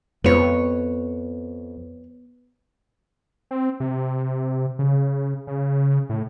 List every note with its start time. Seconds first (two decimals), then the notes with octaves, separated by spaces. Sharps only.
0.24 F2 B3 B4 C#5
3.51 C4
3.80 C3
4.79 C#3
5.47 C#3
6.09 A2